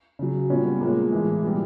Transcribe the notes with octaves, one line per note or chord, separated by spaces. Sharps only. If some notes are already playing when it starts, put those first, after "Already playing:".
C#3 F#3
A#2 G3 B3 C#4
B3
A#2 F3 G#3 A#3
A2 E3 G#3
B2 G3 B3